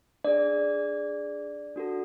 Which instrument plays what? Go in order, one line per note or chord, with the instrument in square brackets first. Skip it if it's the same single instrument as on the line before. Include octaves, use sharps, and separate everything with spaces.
[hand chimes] D4 G#4 D5
D4 F#4 A4